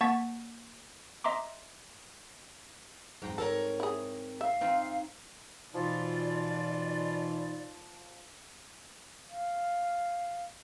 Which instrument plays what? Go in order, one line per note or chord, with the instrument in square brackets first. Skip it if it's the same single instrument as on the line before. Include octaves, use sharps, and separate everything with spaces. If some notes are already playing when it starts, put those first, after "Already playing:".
[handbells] A#3 F#5 A5 C#6 A6 B6
D#5 E5 A#5 C6 D6
[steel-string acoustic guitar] F2 F#3 [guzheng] G#2 G5 A#5
[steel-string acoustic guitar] C4 A#4 C#5 [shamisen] A4
[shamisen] E4 G#4
[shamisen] E5 [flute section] F5
[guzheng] C4 D#4 F4
[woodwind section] B2 E3 F4 [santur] F3 [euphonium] D#4 [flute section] D5
[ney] F5